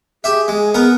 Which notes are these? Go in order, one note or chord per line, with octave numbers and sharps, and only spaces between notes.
G4 G#4 E5
G#3
B3 A#4